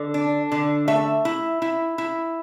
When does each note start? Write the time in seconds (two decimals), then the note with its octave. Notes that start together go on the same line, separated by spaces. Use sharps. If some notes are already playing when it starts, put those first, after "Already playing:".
Already playing: D3 A4
0.14 D4
0.52 D3
0.88 A3 E5
1.25 E4
1.62 E4
1.98 E4